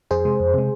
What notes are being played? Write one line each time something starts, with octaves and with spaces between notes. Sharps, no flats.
F2 G#4 C5
C3 G#3
F2
C3 G#3